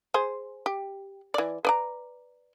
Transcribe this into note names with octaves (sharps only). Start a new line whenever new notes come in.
G#4 C5
G4
E3 D5
B4 D5 A#5